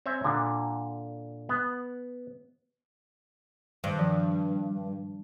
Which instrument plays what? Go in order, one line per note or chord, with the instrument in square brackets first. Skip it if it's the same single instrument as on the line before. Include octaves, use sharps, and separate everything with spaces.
[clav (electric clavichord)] C4 C#5 E5 G#5
A#2 D3
B3
[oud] G2 [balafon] D#3
[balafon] F3